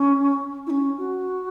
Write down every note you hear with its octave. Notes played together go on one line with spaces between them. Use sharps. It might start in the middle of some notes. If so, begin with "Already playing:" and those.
Already playing: C#4
E4
C#4
F#4